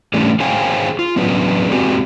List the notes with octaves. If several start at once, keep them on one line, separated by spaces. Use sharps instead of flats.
E3 G3 A3 C#4 D4
G#4 C5 C#5 F5 G5 G#5
F4
F#3 B3 C#4 D4 G#4 B4
G#3 C4 F#4 G4 D5 G#5